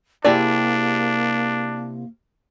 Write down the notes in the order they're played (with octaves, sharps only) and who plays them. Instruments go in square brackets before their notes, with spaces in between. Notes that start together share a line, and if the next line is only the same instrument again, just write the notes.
[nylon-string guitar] C3 E4 A5 [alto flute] A#3 [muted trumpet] D4 [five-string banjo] G4 G#4 D5